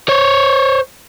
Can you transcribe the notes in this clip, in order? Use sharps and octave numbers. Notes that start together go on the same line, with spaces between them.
C5 C#5